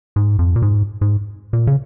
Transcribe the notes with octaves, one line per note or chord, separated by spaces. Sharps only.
G#2
F2
A#2
G#2
G#2
A#2
C#3